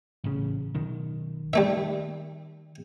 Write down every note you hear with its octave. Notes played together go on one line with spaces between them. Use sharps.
A1 C#3
B1 D#3
D#3 G3 A3 E5